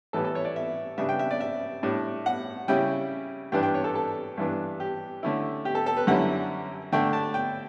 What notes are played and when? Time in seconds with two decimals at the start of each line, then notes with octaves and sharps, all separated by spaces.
0.13 A2 E3 G3 B3 E4 A4
0.24 A4
0.35 C#5
0.45 D5
0.56 E5
0.98 C#3 G3 B3 D4 E5
1.09 G5
1.19 E5
1.31 D5
1.41 E5
1.83 A2 G3 D4
2.26 F#5
2.68 C#3 G3 C#4 E4 G5
3.52 G2 E3 G3 B3 D4 G5
3.63 G5
3.74 C#5
3.84 A4
3.95 A4
4.37 G2 E3 B3 D4
4.80 G4
5.23 D3 A3 C#4 E4
5.65 G4
5.75 A4
5.86 A4
5.97 B4
6.07 F#2 D3 G3 C#4 E4 F#5
6.92 D3 A3 D4 G5
7.13 A5
7.34 G5